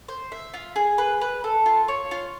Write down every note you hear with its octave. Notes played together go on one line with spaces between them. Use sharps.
C5
E5
F4
G#4
B4
B4
A4
F4
C#5
F4